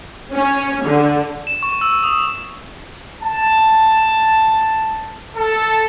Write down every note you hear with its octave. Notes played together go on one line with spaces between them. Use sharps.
C#4
D3
E7
C#6
E6
D#6
A5
A4